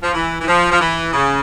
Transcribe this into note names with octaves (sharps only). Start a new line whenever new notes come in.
F3
E3
E3
F3
F3
E3
C#3